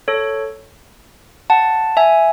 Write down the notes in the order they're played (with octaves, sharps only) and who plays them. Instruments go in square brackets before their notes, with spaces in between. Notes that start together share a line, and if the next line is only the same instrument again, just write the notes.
[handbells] A4 C#5
F#5 A5
E5 G#5